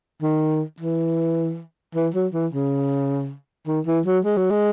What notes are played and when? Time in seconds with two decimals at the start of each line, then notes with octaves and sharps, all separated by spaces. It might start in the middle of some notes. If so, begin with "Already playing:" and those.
0.22 D#3
0.80 E3
1.95 E3
2.14 F#3
2.33 E3
2.53 C#3
3.67 D#3
3.87 E3
4.05 F#3
4.25 G#3
4.37 F#3
4.50 G#3